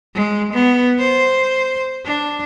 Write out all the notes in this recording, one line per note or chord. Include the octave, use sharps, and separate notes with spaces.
G#3
B3
C5
D4